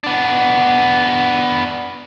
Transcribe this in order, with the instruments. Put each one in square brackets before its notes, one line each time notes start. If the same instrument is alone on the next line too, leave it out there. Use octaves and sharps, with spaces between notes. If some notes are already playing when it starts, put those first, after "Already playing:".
[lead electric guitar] B3 D4